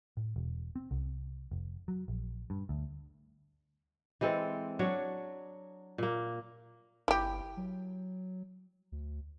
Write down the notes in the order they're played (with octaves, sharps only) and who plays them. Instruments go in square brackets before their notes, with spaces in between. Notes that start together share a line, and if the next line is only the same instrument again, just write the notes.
[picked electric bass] A2
E1
C4
C2
F1
F#3
A#1
G2
D2
[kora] E3 G#3 C4 A4
F#3 D4 C#5
A#2 A#3
[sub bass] G1 [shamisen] E4 G4
[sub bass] F#3
D2